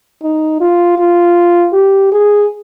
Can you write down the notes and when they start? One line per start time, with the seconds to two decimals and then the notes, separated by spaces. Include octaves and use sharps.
0.23 D#4
0.61 F4
0.99 F4
1.73 G4
2.12 G#4